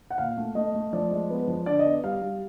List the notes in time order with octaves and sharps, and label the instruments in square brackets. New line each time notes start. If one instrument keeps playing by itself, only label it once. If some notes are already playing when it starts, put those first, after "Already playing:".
[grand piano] F#5
A#2 F5
A3
A3 D#5
A3
F3 D5
G#3
B3
F3
D3 D5
D#5
B3
G3 F5
G3